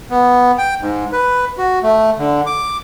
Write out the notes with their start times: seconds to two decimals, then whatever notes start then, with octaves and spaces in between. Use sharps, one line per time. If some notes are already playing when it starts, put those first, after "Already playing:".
0.10 B3
0.58 G5
0.82 G#2
1.12 B4
1.58 F#4
1.83 A3
2.18 D3
2.46 D6